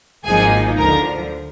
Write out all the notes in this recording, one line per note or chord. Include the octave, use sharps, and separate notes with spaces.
G#1 G#2 F3 A#3 D#4 G#4 G#5
D2 D3 F3 A#4 A#5